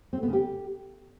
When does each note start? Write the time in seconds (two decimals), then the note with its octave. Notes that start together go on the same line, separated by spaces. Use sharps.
0.13 C4
0.18 A3
0.23 B3
0.28 C#3
0.33 G4